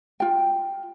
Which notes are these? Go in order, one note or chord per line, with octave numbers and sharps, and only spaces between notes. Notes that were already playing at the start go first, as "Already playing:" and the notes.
F4 G5